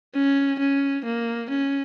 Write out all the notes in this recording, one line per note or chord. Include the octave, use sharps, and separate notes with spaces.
C#4
C#4
A#3
C#4